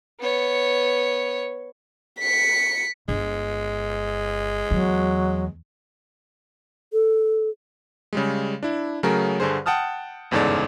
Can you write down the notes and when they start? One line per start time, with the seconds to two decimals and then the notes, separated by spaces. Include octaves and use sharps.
0.20 B3 C#5
2.19 B6 C#7
3.09 G1 G#3
4.71 E2 F#3
6.93 A4
8.13 C#3 G3 G#3
8.63 D4 E4
9.03 C#3 F#3 A3 G#4 A#4
9.40 G2 D3 G#4 C5
9.66 F#5 G5 A5 D#6 F6
10.31 G1 E2 G#2 C#3 A4 D5